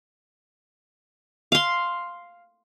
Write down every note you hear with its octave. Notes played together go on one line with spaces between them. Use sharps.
F5 C6